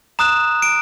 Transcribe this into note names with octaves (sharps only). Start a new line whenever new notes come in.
A#5 D#6 F#6 E7
D7